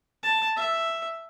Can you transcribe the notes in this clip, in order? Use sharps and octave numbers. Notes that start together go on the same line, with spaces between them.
A5
E5